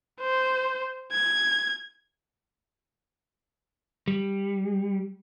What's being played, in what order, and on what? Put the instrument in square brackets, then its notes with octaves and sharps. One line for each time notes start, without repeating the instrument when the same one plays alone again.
[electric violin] C5
G#6
[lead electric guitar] G3